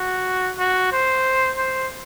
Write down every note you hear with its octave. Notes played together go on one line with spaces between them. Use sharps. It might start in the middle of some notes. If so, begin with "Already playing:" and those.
Already playing: F#4
F#4
C5
C5